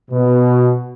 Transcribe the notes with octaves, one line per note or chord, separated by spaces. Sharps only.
B2